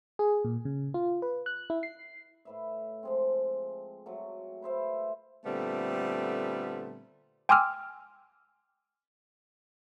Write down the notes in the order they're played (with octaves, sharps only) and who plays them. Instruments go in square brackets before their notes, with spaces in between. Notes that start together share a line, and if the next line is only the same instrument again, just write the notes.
[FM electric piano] G#4
A#2
C#3
F4
B4
F#6
E4
C7
[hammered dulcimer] A2 B4 E5
F3 G#3 C4
F#3 A3
B4 C5 E5 F5
[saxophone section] A#2 D3 G3 A3 B3 C4
[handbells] G5 G#5 C6 D6 E6 F6